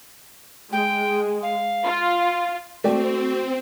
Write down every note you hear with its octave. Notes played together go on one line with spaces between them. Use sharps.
G#3 G5
F5
F4
A3 C4 F#4 D5 G5